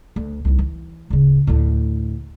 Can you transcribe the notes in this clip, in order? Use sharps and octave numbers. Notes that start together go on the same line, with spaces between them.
D2
C2 D#4
E3
D1 C#3
D2 A2